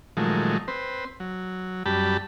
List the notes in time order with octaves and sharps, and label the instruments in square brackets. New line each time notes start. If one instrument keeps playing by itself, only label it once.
[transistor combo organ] A#2 D#3 F3 F#3 G#3 A3
C4 B4 C5
F#3
F#2 G3 G4 A5 B5